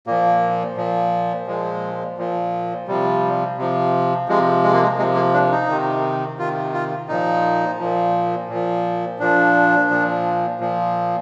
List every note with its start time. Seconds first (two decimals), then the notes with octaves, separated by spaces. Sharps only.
0.07 A#2 F3 A#3
0.77 A#2 F3
1.47 A#2 F3 G#3
2.18 A#2 F3
2.87 C3 F3 G3
3.58 C3 F3
4.28 C3 F3 G#3
4.63 G#3
4.73 A#3
4.83 G#3
4.98 C3 F3 G#3
5.15 A#3
5.33 D4
5.52 D#4
5.69 C3 D#3
6.39 C3 D#3 F4
6.74 F4
7.08 A#2 F3 D#4
7.79 A#2 F3
8.49 A#2 F3
9.19 A#2 F3 D4
9.90 A#2 F3
10.60 A#2 F3